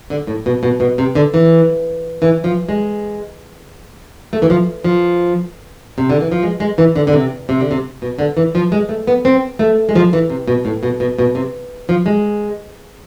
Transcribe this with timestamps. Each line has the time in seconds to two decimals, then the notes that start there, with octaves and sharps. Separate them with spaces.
0.10 D3
0.27 A2
0.46 B2
0.63 B2
0.80 B2
0.98 C3
1.15 D3
1.34 E3
2.22 E3
2.44 F3
2.69 G#3
4.33 A3
4.42 E3
4.50 F3
4.84 F3
5.98 C3
6.10 D3
6.21 E3
6.32 F3
6.43 G#3
6.60 G#3
6.78 E3
6.96 D3
7.07 D3
7.13 C3
7.49 C3
7.60 D3
7.71 C3
8.02 B2
8.19 D3
8.37 E3
8.55 F3
8.72 G#3
8.89 A3
9.07 B3
9.25 C4
9.59 A3
9.89 G#3
9.95 F3
10.13 E3
10.30 C3
10.48 B2
10.65 A2
10.83 B2
11.00 B2
11.19 B2
11.35 C3
11.89 F3
12.06 G#3